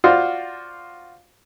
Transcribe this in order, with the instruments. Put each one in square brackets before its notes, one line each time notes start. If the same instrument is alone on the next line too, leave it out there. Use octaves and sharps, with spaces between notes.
[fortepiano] F4 F#4 C5 D5 F5